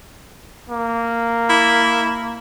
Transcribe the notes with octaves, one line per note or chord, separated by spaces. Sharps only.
A#3
E4